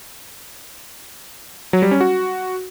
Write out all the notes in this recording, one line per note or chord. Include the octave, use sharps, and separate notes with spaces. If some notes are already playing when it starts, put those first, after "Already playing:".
F#3
G3
C#4
F#4